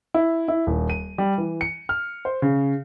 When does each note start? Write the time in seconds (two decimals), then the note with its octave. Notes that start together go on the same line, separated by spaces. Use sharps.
0.14 E4
0.48 E4
0.67 D#1
0.90 D#7
1.18 G3
1.38 E3
1.61 C#7
1.89 F6
2.25 C5
2.42 C#3